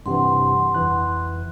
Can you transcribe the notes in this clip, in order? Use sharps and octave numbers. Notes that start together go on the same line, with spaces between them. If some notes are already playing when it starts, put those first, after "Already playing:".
G2 C3 E3 F#5 C6
F2 E3 F#6